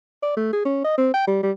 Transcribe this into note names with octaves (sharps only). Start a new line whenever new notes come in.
D5
A3
G#4
C#4
D#5
C4
G5
G3
G3